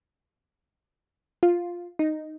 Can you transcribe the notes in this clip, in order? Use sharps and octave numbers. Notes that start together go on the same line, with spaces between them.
F4
D#4